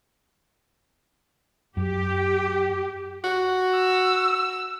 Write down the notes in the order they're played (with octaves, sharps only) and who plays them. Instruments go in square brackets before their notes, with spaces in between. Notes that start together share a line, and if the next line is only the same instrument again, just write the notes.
[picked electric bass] F#2 [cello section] G4
[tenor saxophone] F#4
[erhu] E6